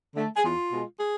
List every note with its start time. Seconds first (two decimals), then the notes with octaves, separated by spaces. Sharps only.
0.16 D3 A3
0.37 G#4
0.44 E2 F4
0.72 B2 G#3
1.00 G#4